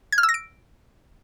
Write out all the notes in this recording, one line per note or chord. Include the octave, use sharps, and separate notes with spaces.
G#6
F6
E6
A#6
D7